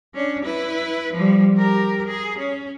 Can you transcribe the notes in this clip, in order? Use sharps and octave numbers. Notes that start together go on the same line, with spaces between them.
C#4 D4
E4 B4
F3 G3
G4 A#4
G#4
C#4